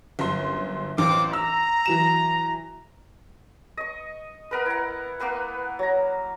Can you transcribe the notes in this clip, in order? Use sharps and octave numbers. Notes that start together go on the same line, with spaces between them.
G1 F#2 C6
A1 C4 F4 D6
A#5 E6
E3 F#3 E7
D#5 C#6
B3 A#4 B4
E4 F#5
A#3 B3 B4 F#5
F#3 A#5